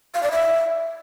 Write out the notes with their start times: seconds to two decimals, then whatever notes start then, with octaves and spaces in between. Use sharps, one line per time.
0.15 F5
0.23 D5
0.31 E5